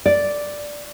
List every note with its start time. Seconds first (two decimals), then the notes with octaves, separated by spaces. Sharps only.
0.06 D5